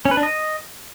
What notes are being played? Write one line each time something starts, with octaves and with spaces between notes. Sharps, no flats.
C#4
B4
D4
D#5